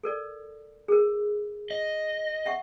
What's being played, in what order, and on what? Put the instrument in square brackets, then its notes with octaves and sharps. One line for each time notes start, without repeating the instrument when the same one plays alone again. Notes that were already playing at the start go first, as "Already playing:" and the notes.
[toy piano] A4 A#4 D5
G#4 A#4
[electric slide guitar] D#5
[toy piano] E5 F#5 C#6